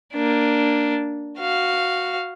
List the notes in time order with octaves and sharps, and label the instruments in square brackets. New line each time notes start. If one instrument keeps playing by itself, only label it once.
[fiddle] A#3 D4
F#4 F5